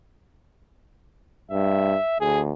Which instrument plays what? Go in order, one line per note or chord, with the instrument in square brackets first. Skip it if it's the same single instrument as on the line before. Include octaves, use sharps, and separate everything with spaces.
[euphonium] G2 [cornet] E5
[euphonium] D2 [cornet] G#4